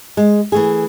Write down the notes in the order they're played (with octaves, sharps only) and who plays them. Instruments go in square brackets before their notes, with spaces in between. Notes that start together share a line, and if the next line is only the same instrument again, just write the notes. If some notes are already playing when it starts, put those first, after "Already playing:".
[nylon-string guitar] G#3
E3 A3 G#4